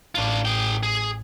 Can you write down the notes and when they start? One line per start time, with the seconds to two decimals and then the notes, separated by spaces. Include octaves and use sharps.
0.15 A1 D4 F4
0.45 G#4 G5
0.83 G#4